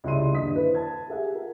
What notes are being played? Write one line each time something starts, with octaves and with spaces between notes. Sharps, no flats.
C#2 G3 E4 E5 C6 D#7
D#1 G2 D3 D#5 D#6 B6
E4 B4 C5
A5 G#6
G4 G#4 E5 F#5
F4 A#4